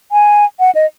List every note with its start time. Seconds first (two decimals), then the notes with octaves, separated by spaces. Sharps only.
0.12 G#5
0.60 F#5
0.75 D#5